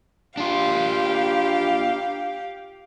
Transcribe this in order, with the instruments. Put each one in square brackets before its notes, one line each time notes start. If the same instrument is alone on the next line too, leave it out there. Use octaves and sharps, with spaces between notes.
[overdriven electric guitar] D4 F4 [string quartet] G4 F5